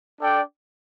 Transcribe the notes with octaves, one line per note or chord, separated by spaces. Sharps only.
D4 A4 D5 G5